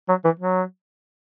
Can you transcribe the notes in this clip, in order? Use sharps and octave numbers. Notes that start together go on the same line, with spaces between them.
F#3
E3
F#3